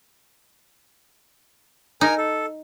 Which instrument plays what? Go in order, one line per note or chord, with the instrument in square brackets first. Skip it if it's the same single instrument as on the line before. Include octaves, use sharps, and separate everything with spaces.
[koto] D#4 [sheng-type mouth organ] A#4 G#5
[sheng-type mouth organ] A4